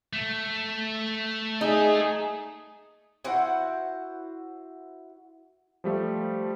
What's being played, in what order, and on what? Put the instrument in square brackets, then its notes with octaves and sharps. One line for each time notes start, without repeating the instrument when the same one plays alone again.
[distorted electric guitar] A3
[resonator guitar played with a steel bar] D#4 [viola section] G#4
[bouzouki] E4 F#4 C5 F#5
[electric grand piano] F3 G3 A3